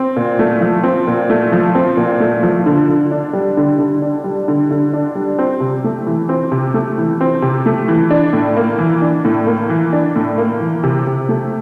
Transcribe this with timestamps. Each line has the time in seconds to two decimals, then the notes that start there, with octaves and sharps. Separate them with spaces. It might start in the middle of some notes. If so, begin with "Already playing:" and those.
Already playing: C4
0.16 A#2
0.39 A3
0.61 F3
0.83 C4
1.07 A#2
1.30 A3
1.52 F3
1.75 C4
1.97 A#2
2.20 A3
2.43 F3
2.66 D3
2.89 D3
3.11 D4
3.33 G3
3.57 D3
3.79 D3
4.02 D4
4.24 G3
4.48 D3
4.71 D3
4.93 D4
5.15 G3
5.39 C4
5.60 C3
5.84 A3
6.07 E3
6.29 C4
6.52 C3
6.74 A3
6.98 E3
7.21 C4
7.42 C3
7.66 A3
7.88 E3
8.11 D4
8.33 A2
8.57 A#3
8.78 E3
9.02 D4
9.25 A2
9.47 A#3
9.70 E3
9.93 D4
10.16 A2
10.38 A#3
10.60 E3
10.83 C3
11.07 C3
11.29 A3